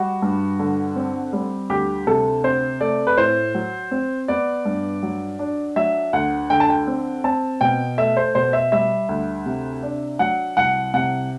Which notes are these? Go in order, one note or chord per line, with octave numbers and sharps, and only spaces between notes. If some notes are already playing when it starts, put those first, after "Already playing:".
Already playing: G3 F#4
G2
D3
C4
G3
D2 G4
C3 A4
C4 C5
A3 D5
B4
A2 C5
F#3
C4
B3 D5
G2
F#3
D4
F#3 E5
D2 F#5
D3 G5
A5
G5
C4
C4 A5
B2 G5
A3 E5
C5
B2 C5
E5
G3 E5
D2
C3
D4
F#3 F#5
C2 F#5
C3 F#5